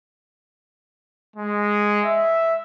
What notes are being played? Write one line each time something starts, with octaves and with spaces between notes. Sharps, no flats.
G#3
E5